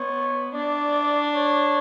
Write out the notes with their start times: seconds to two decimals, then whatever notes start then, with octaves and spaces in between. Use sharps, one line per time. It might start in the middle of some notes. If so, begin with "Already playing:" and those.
Already playing: B3 C#5
0.54 D4 D5
1.35 C#5